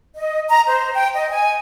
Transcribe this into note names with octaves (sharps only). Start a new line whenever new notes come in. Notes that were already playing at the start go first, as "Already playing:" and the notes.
D#5
A#5
C5
G5
D#5
G#5